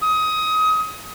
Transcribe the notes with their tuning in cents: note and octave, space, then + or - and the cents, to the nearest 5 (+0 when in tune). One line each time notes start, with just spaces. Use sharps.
D#6 +20